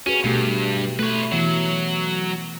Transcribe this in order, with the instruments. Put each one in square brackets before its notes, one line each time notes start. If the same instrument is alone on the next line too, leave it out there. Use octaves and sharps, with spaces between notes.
[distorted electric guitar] C#4 [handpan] F#4 G#4 B4
[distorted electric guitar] G2 [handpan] B2 A3 G4
[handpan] A3 [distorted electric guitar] B4 C#5
[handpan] E3 B3 [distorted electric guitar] F#3